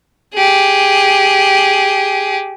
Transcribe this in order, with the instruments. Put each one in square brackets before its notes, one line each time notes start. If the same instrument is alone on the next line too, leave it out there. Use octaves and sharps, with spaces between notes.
[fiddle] G4 G#4